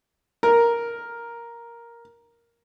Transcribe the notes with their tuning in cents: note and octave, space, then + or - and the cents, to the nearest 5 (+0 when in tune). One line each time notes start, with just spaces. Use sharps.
A#4 +5